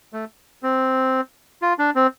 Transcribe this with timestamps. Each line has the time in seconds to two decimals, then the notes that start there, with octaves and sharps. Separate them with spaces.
0.13 A3
0.63 C4
1.62 F4
1.79 D4
1.95 C4